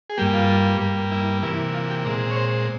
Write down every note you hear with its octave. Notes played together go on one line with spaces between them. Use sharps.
G#4
G2 G3 A#3 G4
F4
G2 G3 A#3
E4
C3 E3 A#3 E4
F4
G4
A#2 G#3 C4 A#4
C#5
C5